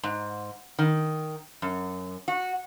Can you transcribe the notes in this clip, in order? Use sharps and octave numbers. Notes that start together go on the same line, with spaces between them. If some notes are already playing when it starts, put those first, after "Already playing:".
G#2
D#3
F#2
F#4